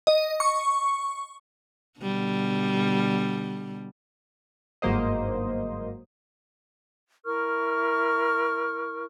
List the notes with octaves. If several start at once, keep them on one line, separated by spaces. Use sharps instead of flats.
D#5
C#6
B2 D3 G3
G1 G#2 F#3 A#3 C5 D#5
E4 A#4 C#6 F6